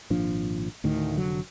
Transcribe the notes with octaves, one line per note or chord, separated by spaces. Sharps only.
G#1 A#2 F3 D4
D2 A2 D#3
F1 D3 F#3